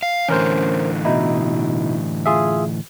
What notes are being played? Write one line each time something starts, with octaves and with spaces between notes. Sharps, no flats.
F5
A2 D3 E3 C#4 A#4 C5
B2 D#4 E4
F4 G#4 E5